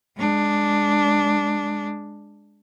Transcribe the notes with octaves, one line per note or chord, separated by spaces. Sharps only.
G#3 D4